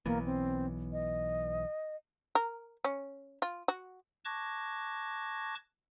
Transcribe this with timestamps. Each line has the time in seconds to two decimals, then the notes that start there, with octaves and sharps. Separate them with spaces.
0.06 B1 E3 A#3 B3
0.26 C4
0.93 D#5
2.35 A#4
2.84 C#4
3.42 F4
3.68 F#4
4.25 A5 C#6 D6 F#6 G#6 A#6